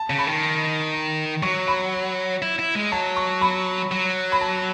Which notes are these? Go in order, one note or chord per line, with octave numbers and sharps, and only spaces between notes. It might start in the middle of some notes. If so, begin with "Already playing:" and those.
Already playing: A5
C#3
B5
D#3
F#3 C#6
B5
E4
E4
G#3
F#3 A5
C#6
B5
F#3
B5
A5